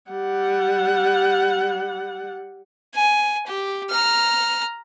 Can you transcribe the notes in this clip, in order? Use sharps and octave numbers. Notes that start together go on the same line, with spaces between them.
G3 F#5
G#5
G4
A#5 F6